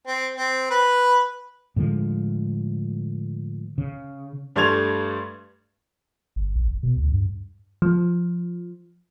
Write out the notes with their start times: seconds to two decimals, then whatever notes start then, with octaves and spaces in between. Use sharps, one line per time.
0.07 C4
0.37 C4
0.70 B4
1.76 A2 D3 F3 G#3
3.78 C#3
4.56 G2 G3 A3 C6 G#6 F7
6.36 G1
6.56 A#1
6.68 F#1
6.83 B2
6.97 D2
7.12 G2
7.82 F3